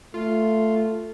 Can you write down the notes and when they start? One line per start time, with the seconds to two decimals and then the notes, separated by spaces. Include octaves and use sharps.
0.14 A3 F4